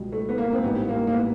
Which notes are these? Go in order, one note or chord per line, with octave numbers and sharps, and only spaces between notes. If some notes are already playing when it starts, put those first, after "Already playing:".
Already playing: C#2 B2 G3
A3
B3
A#3
C4
A1 G#2 E3 G3 B3
A#3
A#3
B3